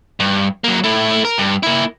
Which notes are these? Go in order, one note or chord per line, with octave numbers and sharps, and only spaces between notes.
G2
F#3 A#3
A3 E4
A#4
G2
A#3 E4